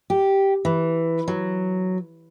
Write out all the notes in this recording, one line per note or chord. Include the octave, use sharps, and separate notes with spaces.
G4
E3
F#3